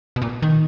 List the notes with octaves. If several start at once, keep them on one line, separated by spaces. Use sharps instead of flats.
B2
A#2
D#3